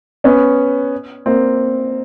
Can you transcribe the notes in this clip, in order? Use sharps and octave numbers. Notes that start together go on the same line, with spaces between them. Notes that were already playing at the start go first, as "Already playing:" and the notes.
B3 C#4
A#3 C4